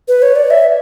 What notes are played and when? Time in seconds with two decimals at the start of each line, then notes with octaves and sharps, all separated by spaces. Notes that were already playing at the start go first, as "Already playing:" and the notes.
0.08 B4
0.22 C#5
0.36 D5
0.51 E5